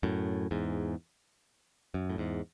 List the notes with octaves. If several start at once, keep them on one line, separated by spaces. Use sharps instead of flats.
F#2 A2
E2 G#2
F#2
A2
E2 G#2